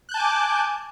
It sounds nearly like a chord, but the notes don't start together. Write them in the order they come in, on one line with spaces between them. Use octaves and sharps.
F#6 G6 A5 G#5 D6